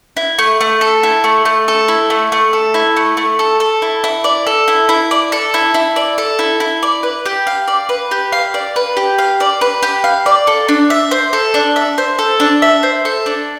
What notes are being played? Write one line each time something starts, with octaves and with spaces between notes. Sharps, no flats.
E4
A3
A3
A4
E4
A3
A3
A4
E4
A3
A3
A4
E4
A3
A3
A4
A4
E4
E4
D5
A4
E4
E4
D5
A4
E4
E4
D5
A4
E4
E4
D5
B4
G4
F5
D5
B4
G4
F5
D5
B4
G4
F5
D5
B4
G4
F5
D5
A4
D4
E5
C5
A4
D4
E5
C5
A4
D4
E5
C5
A4
D4